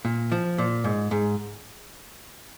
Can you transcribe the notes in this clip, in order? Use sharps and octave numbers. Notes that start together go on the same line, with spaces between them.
A#2
F3
A#2
G#2
G#2